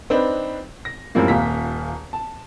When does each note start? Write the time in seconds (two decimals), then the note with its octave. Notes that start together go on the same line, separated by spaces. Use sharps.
0.10 C4 D4 D#4 B4
0.85 A#6
1.15 F#2 A2 F3 G3 G#3 A#3
1.28 D#1 A#2 F4 A#5 B6
2.13 A5